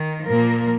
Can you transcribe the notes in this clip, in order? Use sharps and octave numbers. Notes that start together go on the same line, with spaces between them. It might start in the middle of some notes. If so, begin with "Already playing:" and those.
Already playing: D#3
A#2 F3 A#3 A#4